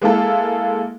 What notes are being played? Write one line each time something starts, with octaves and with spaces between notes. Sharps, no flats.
G#3 A#3 E4 A4